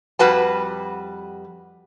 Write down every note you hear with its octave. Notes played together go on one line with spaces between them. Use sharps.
F2 G3 F#4 B4 A5